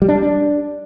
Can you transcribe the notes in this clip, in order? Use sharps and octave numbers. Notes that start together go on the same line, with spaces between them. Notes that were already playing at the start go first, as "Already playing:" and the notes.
G3
D4
G3
D4